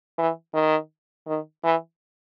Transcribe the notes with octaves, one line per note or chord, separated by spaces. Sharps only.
E3
D#3
D#3
E3